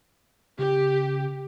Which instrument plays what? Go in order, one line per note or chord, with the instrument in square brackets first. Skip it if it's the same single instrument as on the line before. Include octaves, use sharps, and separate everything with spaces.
[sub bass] C#3 [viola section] G4